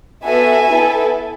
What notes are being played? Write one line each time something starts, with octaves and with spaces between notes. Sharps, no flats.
B3 F#4 A4 E5 G#5
B3 E4 A4